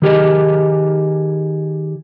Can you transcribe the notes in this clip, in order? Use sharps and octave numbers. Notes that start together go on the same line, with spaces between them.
D#3 G4 G#4 D#5